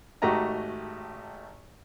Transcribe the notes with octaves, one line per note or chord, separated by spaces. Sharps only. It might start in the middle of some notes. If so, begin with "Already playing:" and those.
G#1 A3 F#4 G4 D#5 A#5